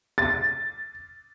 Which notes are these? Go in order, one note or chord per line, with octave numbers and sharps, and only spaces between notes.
A6